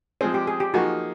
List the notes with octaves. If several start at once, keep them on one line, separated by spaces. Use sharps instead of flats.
F3 G#3 C4 G#4
G4
G#4
G4
F3 A#3 D#4 F#4 G#4